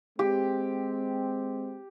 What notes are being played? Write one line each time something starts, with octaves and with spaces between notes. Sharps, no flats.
G#3 C4 G4